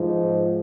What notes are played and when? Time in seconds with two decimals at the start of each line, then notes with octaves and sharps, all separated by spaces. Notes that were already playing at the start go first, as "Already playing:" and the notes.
Already playing: G#2 F3 G#3